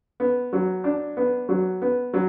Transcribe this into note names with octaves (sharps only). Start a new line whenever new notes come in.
B3
F#3
D4
B3
F#3
B3
F#3